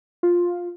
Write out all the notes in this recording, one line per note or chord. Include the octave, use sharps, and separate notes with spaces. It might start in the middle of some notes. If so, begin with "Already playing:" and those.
F4